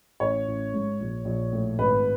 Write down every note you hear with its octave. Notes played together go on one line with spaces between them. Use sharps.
A1 C#5
A1
G#2
A#1
A#1
A2
G#1 B4